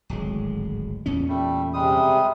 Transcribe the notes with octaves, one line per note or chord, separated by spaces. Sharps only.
D1 G#1 G#3
E2 A#2 C#4
G3 A3
C3 G3 G#3 D#6